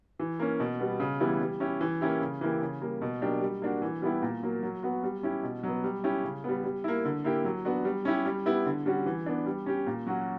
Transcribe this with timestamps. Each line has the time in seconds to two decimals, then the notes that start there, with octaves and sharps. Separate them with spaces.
0.19 E3
0.39 A#3 C#4
0.60 B2
0.79 G3 B3
1.00 C#3
1.20 E3 G3 B3 E4
1.40 G3
1.60 C#4 E4 G4
1.81 E3
2.01 A#3 C#4 E4 G4
2.21 C#3
2.41 E3 A#3 E4 G4
2.61 C#3
2.81 G3 A#3
3.01 B2
3.22 F#3 A#3 D4 G4
3.41 G3
3.62 A#3 D4 F#4
3.82 E3
4.02 G3 B3 E4 G4
4.22 A#2
4.43 F#3 A#3
4.63 F#3
4.83 B3 F#4
5.03 G3
5.23 C#4 E4 G4
5.43 B2
5.63 F#3 B3
5.84 G3
6.04 C#4 E4 G4
6.24 C#3
6.44 G3 B3
6.64 G3
6.84 A#3 E4
7.05 D3
7.24 A#3 E4 G4
7.44 F#3
7.65 B3 D4 F#4
7.85 G3
8.05 C#4 E4 G4
8.25 G3
8.46 B3 E4 G4
8.66 D3
8.86 G3 C#4 F#4
9.06 E3
9.26 B3 D4
9.46 G3
9.66 C#4 G4
9.87 A#2
10.07 F#3 C#4 F#4